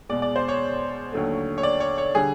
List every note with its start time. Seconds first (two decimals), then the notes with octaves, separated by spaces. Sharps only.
0.09 E2 B2 G#3 D5
0.22 D5
0.36 C5
0.48 C#5
1.12 D#2 D3 F#3 A3
1.58 C#5
1.63 D5
1.80 C#5
1.98 C#5
2.15 D3 G3 G#4